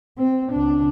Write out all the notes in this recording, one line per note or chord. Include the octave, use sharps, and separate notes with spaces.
C4
C#2 D4